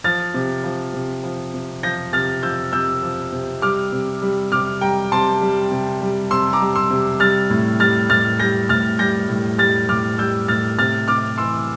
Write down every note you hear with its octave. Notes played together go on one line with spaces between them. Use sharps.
F3 F6 A6
C3
F3
C3
F3
C3
F3 G6 A#6
C3 F6 A6
F3 E6 G6
C3 E6 G6
F3
C3
G3 D6 F6
C3
G3
C3 D6 F6
G3 G5 A#5
C3 A5 C6
G3
C3
G3
C3 C6 E6
A#5 D6
G3
C6 E6
C3
G3 F6 A6
A2
G3 F6 A6
A2 F6 A6
G3 G6 A#6
A2 F6 A6
G3 G6 A#6
A2
G3 F6 A6
A2 D6 F6
G3 E6 G6
A2 F6 A6
C3 F6 A6
C3 D6 F6
E3 C6 E6